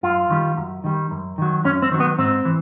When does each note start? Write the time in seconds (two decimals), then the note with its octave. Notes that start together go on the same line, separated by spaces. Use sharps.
0.03 F#2 F4
0.30 D#3 G3
0.57 F#2
0.84 D#3 G3
1.11 F#2
1.38 D#3 F#3
1.64 F#2 C#4
1.82 C4
1.92 D#3 F#3
2.00 B3
2.18 G#2 C4
2.45 E3